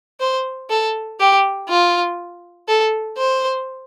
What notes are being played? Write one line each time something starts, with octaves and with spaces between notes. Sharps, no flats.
C5
A4
G4
F4
A4
C5